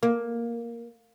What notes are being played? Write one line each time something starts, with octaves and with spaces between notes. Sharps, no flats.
A#3